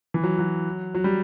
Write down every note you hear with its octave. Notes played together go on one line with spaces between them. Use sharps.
E3
F#3
F#3
F#3
G3